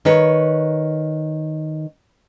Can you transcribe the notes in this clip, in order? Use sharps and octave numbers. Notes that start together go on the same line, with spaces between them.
D#3 B4 C#5